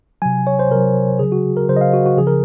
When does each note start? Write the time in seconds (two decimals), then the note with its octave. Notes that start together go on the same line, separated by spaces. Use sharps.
0.22 C3 F#3 G#5
0.47 C#5
0.59 C5
0.71 C3 F#3 A#4
1.19 C#3 F#3 G#4
1.32 F#4
1.57 A#4
1.69 C#3 F#3 C5
1.76 D#5
1.81 F5
1.93 F#4
2.06 F#4
2.17 C#3 F3 G#4
2.27 A#4